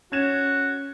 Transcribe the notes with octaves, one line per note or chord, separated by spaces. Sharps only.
C#4 F#4 G#6 E7